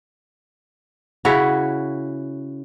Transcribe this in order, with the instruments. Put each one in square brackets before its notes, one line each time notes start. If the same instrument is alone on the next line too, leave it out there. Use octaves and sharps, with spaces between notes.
[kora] C#3 E4 F#4 C#5